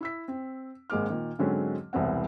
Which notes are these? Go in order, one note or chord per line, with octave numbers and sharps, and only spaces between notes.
E4 E6 B6
C4
G#1 G#3 A#3 D6 F6
A#2 D#3
G#2 D3 F#3 G#3 C4 C#4
E1 C2 E3 B3 C4 F#5